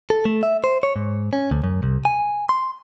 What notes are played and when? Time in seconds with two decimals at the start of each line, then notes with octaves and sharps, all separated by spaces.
0.10 A4
0.25 A3
0.43 E5
0.64 C5
0.83 C#5
0.96 G#2
1.33 C#4
1.51 D2
1.64 F#2
1.83 C2
2.05 G#5
2.49 C6